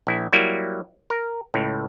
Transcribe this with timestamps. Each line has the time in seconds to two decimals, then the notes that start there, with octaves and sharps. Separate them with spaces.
0.07 A#1 E4
0.33 F#3 G3 A#3 E4
1.10 A#4
1.54 C#2 A2